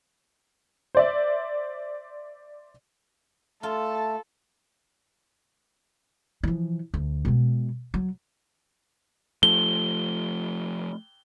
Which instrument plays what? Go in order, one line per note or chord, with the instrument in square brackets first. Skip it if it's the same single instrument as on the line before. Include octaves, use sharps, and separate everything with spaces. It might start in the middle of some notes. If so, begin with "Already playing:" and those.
[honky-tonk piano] C5 D5 E5
[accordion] A3 [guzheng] F4 [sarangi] A4 [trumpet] A5
[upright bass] E3 F3
D2
B2 G#3
F#3
[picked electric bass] F3 A3 [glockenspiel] G7